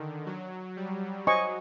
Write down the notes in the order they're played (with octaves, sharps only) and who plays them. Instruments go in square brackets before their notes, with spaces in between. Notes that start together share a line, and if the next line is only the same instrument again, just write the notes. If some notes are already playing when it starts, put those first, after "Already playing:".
Already playing: [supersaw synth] D3 D#3
F#3
G3
[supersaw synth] F#3 [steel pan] C5 D#5 G#5 C#6